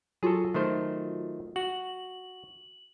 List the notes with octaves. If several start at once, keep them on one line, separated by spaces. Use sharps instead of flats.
F#3 F4 F#4 G#4 A4
D#3 A3 C5
F#4 F#7